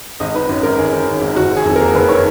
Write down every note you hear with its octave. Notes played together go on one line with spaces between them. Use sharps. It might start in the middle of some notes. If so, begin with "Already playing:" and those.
G#1 D#5
D#3 B4
F#2 B4
G#1 A#4
G#1 G#4
D#3
F#2
G#1
F#1 F#4
D#3
G#4
F2
A#3 A#4
F#1 B4
D#3 C#5